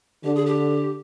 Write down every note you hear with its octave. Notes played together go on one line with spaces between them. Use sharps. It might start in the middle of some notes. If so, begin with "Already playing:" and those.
D3 G4
G#4
G4